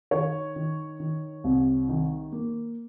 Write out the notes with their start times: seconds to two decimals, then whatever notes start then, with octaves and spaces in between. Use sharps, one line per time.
0.11 D#3 C#5
0.56 D#3
1.00 D#3
1.44 C2
1.89 D#3
2.32 A#3